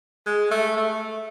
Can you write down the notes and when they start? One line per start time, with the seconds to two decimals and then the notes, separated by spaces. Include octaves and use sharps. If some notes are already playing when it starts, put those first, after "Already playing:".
0.26 G#3
0.51 A3
0.77 A3